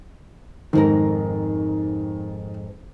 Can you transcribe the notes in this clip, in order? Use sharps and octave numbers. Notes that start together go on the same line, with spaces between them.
F2 G#2 D#3 A#4